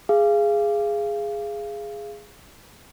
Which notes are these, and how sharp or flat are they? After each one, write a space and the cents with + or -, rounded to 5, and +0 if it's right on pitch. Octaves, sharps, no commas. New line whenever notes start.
G#4 +0 F5 -25